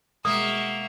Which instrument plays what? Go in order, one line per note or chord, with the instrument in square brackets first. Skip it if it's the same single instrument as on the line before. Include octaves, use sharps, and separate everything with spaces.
[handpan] B2 G#3 [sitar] A#3 [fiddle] F#4 E5 [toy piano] D#6